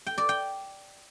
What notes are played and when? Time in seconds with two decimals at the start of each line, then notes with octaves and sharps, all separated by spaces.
0.07 G5
0.18 D5
0.29 G5